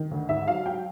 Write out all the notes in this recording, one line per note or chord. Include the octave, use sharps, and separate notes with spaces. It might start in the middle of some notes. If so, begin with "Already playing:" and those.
Already playing: D#3
D2
G#2 E5
F#3 F5
F#3 G5